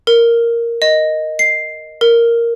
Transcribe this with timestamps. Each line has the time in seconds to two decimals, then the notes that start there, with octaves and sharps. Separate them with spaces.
0.07 A#4
0.82 D#5
1.39 C7
2.01 A#4